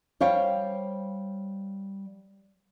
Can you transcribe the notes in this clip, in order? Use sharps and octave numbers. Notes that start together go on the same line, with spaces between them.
G3 C5 C#5 F5 G5